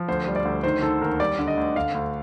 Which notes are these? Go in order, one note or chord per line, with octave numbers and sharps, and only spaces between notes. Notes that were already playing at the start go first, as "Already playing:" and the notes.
Already playing: F3
D2 C5
G3
D5
D2
D#3 C5
D#3 A4
D#2 A#4
G3 D5
D3
D#5
D2
D3 F5
D2